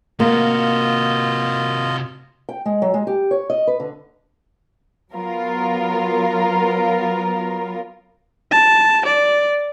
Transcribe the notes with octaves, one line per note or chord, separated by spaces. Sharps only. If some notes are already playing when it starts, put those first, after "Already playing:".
C3 A#3 F4 F#4 D#5
G5
G#3
F#3
G#3
G4
C#5
D#5
B4
D3
F#3 B3 F4 A#4
A5
D5